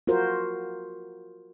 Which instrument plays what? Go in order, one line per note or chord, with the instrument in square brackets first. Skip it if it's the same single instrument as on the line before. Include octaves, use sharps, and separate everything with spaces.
[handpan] F4 F#4 A#4 C5